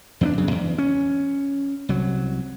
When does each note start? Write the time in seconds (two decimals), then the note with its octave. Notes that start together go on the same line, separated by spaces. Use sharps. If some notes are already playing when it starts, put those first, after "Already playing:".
0.21 E2 B3 D4
0.38 B1 F#2 C#3
0.51 E2
0.78 C#4
1.89 C2 F#3